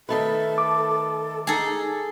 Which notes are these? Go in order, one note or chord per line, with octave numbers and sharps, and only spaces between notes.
D#3 A3 A4 B4
D6
D#4 G#4 A4